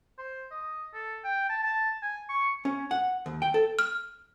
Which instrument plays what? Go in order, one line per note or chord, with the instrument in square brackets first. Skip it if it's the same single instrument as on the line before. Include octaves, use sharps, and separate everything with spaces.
[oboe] C5
D#5
A4
G5
A5
A5
G#5
C#6
[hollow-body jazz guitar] C#4
F#5
D#2
G5
A4
[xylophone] F6